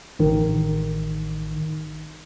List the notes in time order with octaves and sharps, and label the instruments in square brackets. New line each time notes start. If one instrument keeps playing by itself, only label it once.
[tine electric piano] A1 D#3